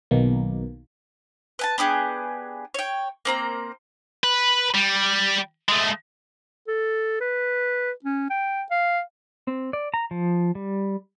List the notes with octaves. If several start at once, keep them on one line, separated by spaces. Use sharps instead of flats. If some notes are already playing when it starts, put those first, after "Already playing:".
B1 B2 D#3 A#3
B4 G#5 A5
B3 D4 G4 G#4
C#5 G5
A#3 C4 A#5
B4
G3
G#3 A3
A4
B4
C#4
G5
F5
C4
D5
A#5
F3
G3